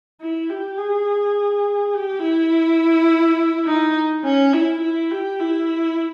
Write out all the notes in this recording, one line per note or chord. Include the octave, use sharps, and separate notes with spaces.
E4
G4
G#4
G4
E4
D#4
C#4
E4
E4
G4
E4